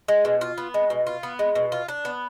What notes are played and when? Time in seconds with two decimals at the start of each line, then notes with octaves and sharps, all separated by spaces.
0.08 G#3
0.25 B2
0.41 F4
0.58 B3
0.74 G#3
0.90 B2
1.07 F4
1.23 B3
1.39 G#3
1.55 B2
1.72 F4
1.88 D4
2.05 B3